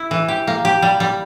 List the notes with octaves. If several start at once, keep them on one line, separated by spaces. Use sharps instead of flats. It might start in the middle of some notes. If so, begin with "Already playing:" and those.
Already playing: E4
E3
G4
A#3
G4
G3
G3